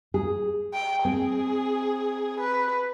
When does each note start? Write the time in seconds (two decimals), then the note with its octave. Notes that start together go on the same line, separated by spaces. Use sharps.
0.14 G#4
0.74 G5
1.05 C4 G#4
2.40 B4